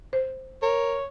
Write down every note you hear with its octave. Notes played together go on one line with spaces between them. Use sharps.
C5
A#4 C#5